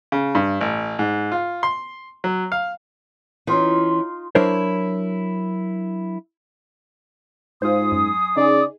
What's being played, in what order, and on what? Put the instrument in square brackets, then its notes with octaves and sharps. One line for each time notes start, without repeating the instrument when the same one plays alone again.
[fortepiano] C#3
G2
A1
G#2
F4
C6
F#3
F5
[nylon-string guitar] E3 C#4 [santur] D#4 F4 C6
[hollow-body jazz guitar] F#3 D4 E4 A#4 C5 C#5
[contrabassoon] G#2 [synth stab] F4 C5 [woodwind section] G#5 C6 D#6
[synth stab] F#2
[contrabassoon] C#3 [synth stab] D#4 G#4 [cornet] D5